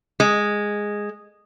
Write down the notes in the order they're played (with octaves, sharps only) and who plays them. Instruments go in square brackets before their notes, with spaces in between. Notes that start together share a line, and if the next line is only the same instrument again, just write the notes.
[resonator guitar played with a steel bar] G#3